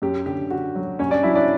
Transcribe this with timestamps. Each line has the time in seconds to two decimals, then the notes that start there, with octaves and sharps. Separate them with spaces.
0.02 F#2 G4
0.26 D3 G4
0.51 D3 F#4
0.75 F#3
0.99 F#2 C#4 C#5
1.11 D4 D5
1.23 F#3 E4 E5
1.35 D4 D5